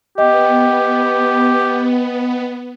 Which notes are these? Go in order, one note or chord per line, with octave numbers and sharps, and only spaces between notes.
B3 G4 D#5 G5